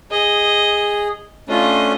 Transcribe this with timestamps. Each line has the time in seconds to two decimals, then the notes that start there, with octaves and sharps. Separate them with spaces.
0.11 G#4 D#5
1.49 A3 C#4 D4 F4 D#5